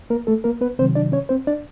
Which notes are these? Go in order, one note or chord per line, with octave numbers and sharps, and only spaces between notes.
A#3 A#4
A3 A4
A#3 A#4
B3 B4
C3 D#3 F#3 C4 C5
D4 D5
C#4 C#5
C4 C5
D4 D5